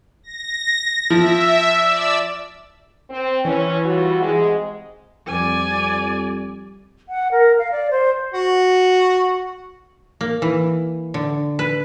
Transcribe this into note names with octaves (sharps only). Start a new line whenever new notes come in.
A#6
F3 E5
D5 E6
C4
E3 C#4
G3 F4 F#4
G#2 C3 G#3
F2 G3 D5 G#5
F#5
A#4
F5
D5
C5
F#4
A#3
E3
D3
B4